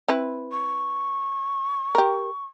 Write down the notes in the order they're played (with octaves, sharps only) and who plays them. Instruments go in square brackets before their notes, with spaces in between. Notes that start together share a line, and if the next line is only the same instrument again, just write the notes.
[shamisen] C4 E4 B4
[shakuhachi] C#6
[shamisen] G4 A#4